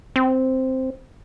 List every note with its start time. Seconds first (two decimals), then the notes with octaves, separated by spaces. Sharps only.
0.16 C4